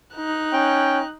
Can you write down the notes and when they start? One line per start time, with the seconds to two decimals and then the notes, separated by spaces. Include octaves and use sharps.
0.15 D#4 F#6
0.53 C#4 G5